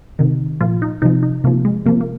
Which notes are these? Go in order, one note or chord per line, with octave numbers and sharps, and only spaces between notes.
C3 D#3
A#2 F3 F4
D#4
C3 F3 D#4
D#4
C3 F3 A#3
G#3
C3 F3 A#3
A#3